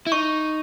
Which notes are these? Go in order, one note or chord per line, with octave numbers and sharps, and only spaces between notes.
E4
D#4 C#6